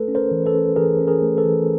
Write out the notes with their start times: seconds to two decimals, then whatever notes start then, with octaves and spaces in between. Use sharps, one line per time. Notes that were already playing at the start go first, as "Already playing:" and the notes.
Already playing: A3 A4 B4
0.08 C#4
0.15 A#4 C5
0.31 E3
0.45 A4 B4
0.54 C#4
0.76 E3 G#4 A#4
1.00 C#4
1.07 G#4 A#4
1.22 A3
1.38 A4 B4
1.45 E3